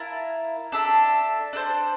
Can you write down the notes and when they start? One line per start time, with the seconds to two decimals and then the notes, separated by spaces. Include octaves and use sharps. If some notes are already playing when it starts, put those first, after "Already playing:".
Already playing: E4 A#4 F5 A5
0.72 D4 A4 E5
1.53 D4 A4 C5